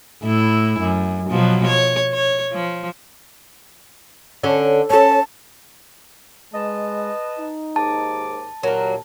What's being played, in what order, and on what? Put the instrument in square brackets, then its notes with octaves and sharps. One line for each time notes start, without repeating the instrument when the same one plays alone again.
[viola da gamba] A2 E4
F#2
B2 F3 F#3
C#5
C#5
F3
[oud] D3 C#4 A4
[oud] C#4 A4 [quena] A5
[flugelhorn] G#3 [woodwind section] B4 D#5 A5
[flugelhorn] D#4
[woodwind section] D#2 G#2 D6 [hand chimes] A5
[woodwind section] D#2 A#2 [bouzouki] F#3 A#3 [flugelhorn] A#4